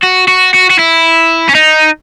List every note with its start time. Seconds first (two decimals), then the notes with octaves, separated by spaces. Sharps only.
0.03 F#4
0.28 F#4
0.54 F#4
0.70 F#4
0.79 E4
1.49 C#4
1.55 D#4